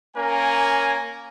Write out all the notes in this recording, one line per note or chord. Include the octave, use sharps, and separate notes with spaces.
A#3 C#4 A#4 G#5